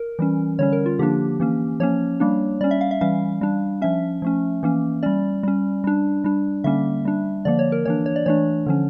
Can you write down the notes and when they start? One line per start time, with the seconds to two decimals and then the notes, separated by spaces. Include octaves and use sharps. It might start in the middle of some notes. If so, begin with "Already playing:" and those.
Already playing: A#4
0.19 E3 G3 C#4
0.59 D3 G3 C#4 C#5
0.73 A#4
0.86 F4
0.99 D3 F3 A#3 D4 G4
1.40 E3 A#3 C#4
1.80 F3 A#3 C#4 C#5
2.20 G3 A#3 D4
2.61 G3 C#4 D5
2.71 E5
2.81 F5
2.91 E5
3.01 E3 G3 C#4 F5
3.41 G3 D4
3.82 F3 C#4 E5
4.22 F3 A3 C#4
4.63 E3 A#3 C#4
5.03 G3 C#4 D5
5.43 G3 C#4
5.84 G3 D4
6.24 G3 D4
6.64 D3 G3 A#3 C#4 E5
7.05 G3 D4
7.45 D3 F3 A#3 D5
7.59 C#5
7.72 A#4
7.85 E3 A#3 D4 C#5
8.06 C#5
8.16 D5
8.26 E3 A3 D4 C#5
8.66 D3 F3 C#4